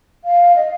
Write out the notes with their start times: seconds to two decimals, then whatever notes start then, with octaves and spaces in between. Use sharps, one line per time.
0.25 F5
0.56 D#5